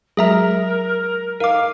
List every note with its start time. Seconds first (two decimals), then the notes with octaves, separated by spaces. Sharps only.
0.17 F#3 G#3 G#4 A#4 E5 A#5
1.40 D#4 A#4 F5 D6